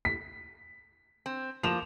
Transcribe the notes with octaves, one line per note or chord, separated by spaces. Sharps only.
B6
C4
F3 A#3 E7 F7